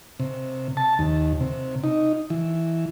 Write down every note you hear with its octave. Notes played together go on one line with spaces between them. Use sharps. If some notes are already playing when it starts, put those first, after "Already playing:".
C3
A5
D#2
C3
D#4
E3